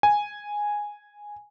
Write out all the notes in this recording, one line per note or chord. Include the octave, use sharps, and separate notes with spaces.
G#5